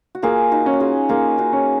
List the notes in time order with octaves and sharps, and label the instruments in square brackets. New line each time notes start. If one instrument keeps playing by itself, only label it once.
[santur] F#4
[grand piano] A#3 [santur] F4 G#4
[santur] D#4 F#4
[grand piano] C#4
[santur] F#4
F4 G#4
[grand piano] A#3 [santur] F4 G#4
[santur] D#4 F#4
[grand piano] C#4